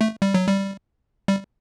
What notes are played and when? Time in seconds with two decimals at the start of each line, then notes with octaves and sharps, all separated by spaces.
0.01 A3
0.22 G3
0.34 F#3
0.47 G3
1.28 G3